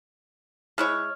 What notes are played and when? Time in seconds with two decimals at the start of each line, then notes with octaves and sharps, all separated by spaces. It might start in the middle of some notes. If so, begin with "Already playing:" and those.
0.78 G#3 E4 C#5 F6